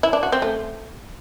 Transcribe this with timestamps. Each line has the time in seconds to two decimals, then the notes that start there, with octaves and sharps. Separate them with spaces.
0.03 E4
0.13 D4
0.23 F#4
0.32 C4
0.42 A3